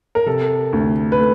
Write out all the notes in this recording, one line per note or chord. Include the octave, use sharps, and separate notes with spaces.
A#4
C3 A4
D2
B4
A3